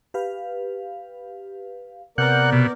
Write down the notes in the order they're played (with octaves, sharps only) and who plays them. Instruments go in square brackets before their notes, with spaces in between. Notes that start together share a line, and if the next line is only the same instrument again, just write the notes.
[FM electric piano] G4 B4 F5
[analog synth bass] C3 [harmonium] B3 A#4 D5 [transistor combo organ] F#5 [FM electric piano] A#5 F6 G6
[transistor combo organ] B2